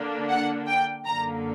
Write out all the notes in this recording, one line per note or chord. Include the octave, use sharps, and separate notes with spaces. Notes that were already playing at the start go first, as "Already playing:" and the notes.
Already playing: D3 A#3 D4
F#5
G5
F#2 D3 A#3 A#5